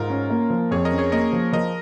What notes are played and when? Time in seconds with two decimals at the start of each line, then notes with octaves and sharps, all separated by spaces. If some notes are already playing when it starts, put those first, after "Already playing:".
Already playing: G#2 F4 A#4
0.10 C#4
0.30 A#3
0.50 F3
0.71 F2 G#4 C#5
0.85 A#4 D#5
0.92 C#4
0.98 G#4 C#5
1.12 A#3 A#4 D#5
1.33 F3
1.53 F3 A#4 D#5